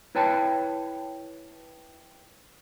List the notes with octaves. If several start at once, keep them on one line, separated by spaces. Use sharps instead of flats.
E4 B4 C#5 G5 A5